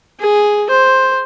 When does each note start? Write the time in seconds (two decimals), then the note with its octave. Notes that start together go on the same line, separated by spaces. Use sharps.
0.20 G#4
0.70 C5